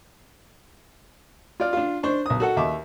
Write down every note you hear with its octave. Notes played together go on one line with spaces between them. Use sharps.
F4 D5 F6
D4 F4
D4 C5 C#6
B1 D#6
F#4 A4 F#5
D#2 E5 D6